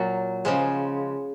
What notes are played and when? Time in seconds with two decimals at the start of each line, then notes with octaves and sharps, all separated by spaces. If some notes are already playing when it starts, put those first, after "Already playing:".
Already playing: A#2 F#3
0.45 C#3 F3 G#3